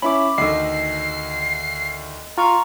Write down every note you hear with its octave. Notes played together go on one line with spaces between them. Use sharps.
C#4 E4 B5 D6
D2 D#3 A4 D#5 C7
F4 A#5 C#6 F6